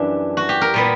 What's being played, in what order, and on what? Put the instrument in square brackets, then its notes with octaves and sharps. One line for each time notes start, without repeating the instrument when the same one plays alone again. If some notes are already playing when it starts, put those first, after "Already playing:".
Already playing: [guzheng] F#2 E3 G3 D4
F#4
G4
A#4
A#2 G3 B3